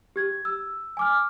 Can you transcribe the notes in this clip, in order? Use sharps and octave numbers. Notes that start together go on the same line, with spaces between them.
G4 G#6
E6
G#5 D6 F6